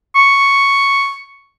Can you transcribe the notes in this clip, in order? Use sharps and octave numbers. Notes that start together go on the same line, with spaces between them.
C#6